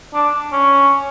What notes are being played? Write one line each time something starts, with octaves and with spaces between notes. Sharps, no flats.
D4
C#4